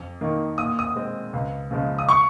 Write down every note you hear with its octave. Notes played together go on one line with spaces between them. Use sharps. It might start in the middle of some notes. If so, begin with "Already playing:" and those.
Already playing: F2
D#3 A#3
A#2 D#6
D#6
G#3 C4
C#2
C#3 F3 G#3
D#6
C#6